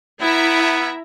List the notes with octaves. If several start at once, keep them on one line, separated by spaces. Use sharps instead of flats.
B3 E4 E5 A#5